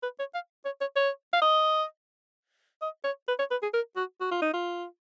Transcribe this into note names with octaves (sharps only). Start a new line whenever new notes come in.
B4
C#5
F5
C#5
C#5
C#5
F5
D#5
D#5
C#5
B4
C#5
B4
G#4
A#4
F#4
F#4
F4
D#4
F4